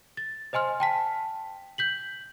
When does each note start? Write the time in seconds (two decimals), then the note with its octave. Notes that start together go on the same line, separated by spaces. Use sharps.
0.17 A6
0.53 C5 D#5 G#5 C6 F6
0.80 G5 A5 B6
1.78 G6 B6 F#7